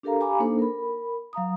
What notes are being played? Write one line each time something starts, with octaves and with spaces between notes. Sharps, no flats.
D4 G4 A4 A#4 F5 A#5
G4 F5 G#5 A#5 B5 D6
A#3 D4 D#4 A4 C5
A#4 B5
F#3 F5 A#5 D#6